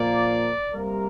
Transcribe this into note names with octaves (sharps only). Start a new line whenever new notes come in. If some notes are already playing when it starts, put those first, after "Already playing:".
Already playing: A#2 F3 A#3 D5
C3 G3 A#3 A#4